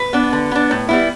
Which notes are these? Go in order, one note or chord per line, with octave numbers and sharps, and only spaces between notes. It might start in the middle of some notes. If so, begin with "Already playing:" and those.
Already playing: B4
B3 D4
D3
B3 D4
A2
G3 B3 E4